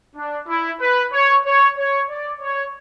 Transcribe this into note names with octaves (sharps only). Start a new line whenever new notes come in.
D4
E4
B4
C#5
C#5
C#5
D5
C#5